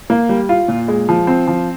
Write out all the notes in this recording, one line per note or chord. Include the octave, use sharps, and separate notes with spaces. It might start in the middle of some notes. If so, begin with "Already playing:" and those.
A#3
G3
F4
A#2
G#3
F3
C4
F3